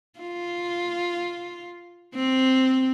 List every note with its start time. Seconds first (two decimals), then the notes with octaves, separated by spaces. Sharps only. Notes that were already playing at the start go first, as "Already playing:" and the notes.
0.19 F4
2.15 C4